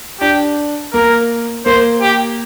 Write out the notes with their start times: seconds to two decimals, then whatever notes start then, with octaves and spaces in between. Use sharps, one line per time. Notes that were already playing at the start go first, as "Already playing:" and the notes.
0.21 D4 G4
0.93 A#3 A#4
1.66 A#3 C5
2.01 G4